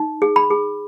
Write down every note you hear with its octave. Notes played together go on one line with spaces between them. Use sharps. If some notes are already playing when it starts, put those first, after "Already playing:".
Already playing: D#4
G#4
B5
G#4